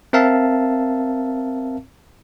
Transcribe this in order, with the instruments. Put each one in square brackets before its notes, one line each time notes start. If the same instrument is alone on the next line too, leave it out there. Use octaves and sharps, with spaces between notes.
[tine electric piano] C4 A#4 E5 F5 A5